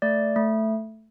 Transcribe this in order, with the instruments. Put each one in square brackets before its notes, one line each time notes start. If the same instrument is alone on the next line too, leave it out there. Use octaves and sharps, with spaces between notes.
[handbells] A3 D5
A3